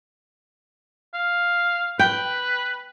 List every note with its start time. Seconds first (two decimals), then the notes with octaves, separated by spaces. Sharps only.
1.14 F5
1.99 B4 G5